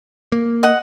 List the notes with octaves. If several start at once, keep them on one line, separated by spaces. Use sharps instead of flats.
A#3
D#5 F#5